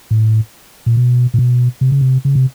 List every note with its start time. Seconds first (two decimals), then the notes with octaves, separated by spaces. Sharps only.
0.11 A2
0.86 A#2
0.97 B2
1.34 A#2
1.39 B2
1.81 C3
1.92 C#3
2.01 C3
2.25 C#3
2.35 C3